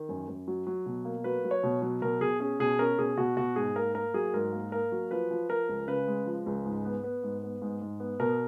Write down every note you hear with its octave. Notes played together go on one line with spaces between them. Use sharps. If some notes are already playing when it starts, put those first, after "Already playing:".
Already playing: D#3
F#2
F#2
F#3
F#3
B2
A#3
F#3 B4
F#3
C#5
B2
F#3
B2 A#4
B2 G#4
C#4 G#4
B2 G#4
C#4 A#4
B2 G#4
B2 F#4
B2 F#4
G#2 G#4
A#3 A#4
A#3 A#4
F#3 G#4
G#2 A#4
A#3
A#3 A#4
F#3
F3 B4
F3
F3 A#4
C#2
C#3 B4
G#3
F3
C#2
G#2
B3
B3
G#2
B3
G#2
G#2
B3
B2 A#4